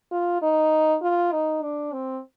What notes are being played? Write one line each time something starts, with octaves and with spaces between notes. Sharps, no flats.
F4
D#4
F4
D#4
D4
C4